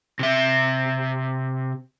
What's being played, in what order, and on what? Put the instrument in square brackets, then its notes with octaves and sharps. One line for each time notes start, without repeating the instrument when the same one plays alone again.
[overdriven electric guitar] C3 E5